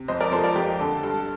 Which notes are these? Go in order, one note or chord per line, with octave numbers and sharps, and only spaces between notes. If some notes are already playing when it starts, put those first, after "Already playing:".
Already playing: C3
F2 C5 D#5
A#4 D5
F3 A4 C5
D#5
A#4 D5
F2 G4
D3 A4
G2 A4